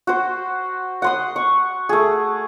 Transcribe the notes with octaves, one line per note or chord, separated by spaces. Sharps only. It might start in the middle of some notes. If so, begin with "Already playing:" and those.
F#4 C5
F#5 C6 D#6
C#6
A3 G#4